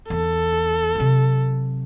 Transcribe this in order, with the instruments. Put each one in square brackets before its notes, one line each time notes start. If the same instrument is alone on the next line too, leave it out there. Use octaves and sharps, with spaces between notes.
[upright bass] E2 [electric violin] A4
[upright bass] C3 F#3